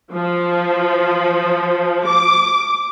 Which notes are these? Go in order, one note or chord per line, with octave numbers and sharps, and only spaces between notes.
F3
D6